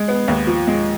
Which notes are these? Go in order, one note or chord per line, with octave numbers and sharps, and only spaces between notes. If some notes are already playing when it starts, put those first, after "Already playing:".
Already playing: G#3
B3
D#2
F3
G#3